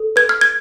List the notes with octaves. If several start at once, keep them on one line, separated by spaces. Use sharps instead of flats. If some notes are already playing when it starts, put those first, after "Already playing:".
Already playing: A4
B4 G#6
F6
G#6